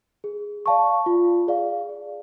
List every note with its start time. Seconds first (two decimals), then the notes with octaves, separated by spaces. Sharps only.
0.24 G#4
0.66 D5 F5 A5 C#6
1.06 F4
1.48 G#4 D5 F5
1.89 G#4